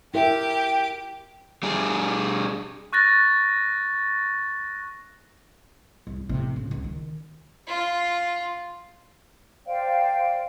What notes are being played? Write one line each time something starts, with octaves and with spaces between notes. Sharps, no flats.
E4 G4 A#4 E5 G5 D6
G3 D4 G#4
C#6 F#6 A6 A#6
C2
A2 C3
C#3
C#2
D#3
F4
C5 D5 F5 G5